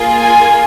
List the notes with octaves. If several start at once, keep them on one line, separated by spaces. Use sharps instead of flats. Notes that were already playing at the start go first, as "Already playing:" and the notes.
Already playing: A#3 F4 G#4
G#5